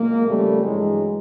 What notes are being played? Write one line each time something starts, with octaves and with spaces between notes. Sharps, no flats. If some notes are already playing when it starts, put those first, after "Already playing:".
Already playing: A#2 F#3 G#3 A#3
F2 C#3 F3 G3 A3
G2 E3 F#3 G#3